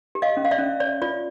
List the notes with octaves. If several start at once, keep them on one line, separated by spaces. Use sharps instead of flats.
G4
D#5 F5
C#4
F5
D5 E5
C#4
C#5 D5
F4 D5